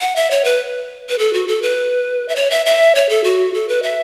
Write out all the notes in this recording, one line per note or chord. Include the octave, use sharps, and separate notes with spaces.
F#5
E5
C#5
B4
B4
A4
F#4
A4
B4
E5
C#5
E5
E5
C#5
A4
F#4
A4
B4
E5